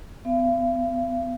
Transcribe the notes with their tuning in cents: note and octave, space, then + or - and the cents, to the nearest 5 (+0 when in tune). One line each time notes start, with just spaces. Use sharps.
B3 +40 F5 -45